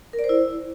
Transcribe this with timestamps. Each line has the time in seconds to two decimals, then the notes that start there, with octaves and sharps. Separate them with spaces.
0.13 A#4
0.19 D5
0.24 C5
0.29 E4